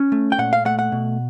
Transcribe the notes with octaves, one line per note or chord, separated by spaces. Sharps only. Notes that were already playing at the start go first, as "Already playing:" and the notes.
Already playing: C#4
A3
G5
A#2 F#5
F5
A3 F#5
F#5
B2